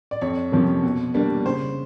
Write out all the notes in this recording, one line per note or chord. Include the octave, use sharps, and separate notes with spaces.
D5
F2 C#5
C3 F3 A#3 C#4
B2
G3 A#3 D4
C#3 C5